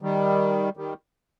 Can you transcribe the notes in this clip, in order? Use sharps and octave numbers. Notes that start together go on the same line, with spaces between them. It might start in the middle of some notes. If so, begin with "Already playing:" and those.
D#3 G3
D#3 G3